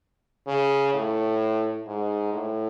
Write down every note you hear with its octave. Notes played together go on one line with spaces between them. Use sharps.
C#3
A2
G#2
A2